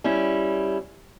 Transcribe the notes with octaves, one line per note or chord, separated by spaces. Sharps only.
G3 C#4 E4